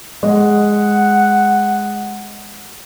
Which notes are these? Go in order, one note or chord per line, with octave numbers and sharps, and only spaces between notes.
G#3 F#5